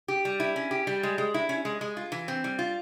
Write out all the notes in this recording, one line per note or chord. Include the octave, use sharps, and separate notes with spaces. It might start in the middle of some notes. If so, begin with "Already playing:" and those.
G4
G3
E4
C#4
G4
G3
G#3
G#3
E4
C#4
G#3
G#3
F4
E3
C4
G3
F4